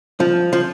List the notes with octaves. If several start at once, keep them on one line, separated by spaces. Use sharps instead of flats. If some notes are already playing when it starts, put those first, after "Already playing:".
F3
F3